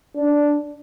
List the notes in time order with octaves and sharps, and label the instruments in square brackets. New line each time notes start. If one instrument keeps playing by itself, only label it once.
[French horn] D4